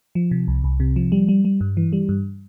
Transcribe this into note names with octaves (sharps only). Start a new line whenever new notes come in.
F3
C3
C2
C2
C3
F3
G3
G3
G3
G2
E3
G3
G2